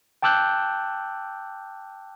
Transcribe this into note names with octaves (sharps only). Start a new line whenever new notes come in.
G5 A5 D6 E6 F#6 G6